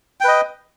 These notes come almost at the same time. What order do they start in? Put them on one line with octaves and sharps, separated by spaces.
G5 B4 D#5